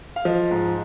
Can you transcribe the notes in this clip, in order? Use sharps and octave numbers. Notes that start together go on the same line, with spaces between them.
F5
F3 D#5
G#2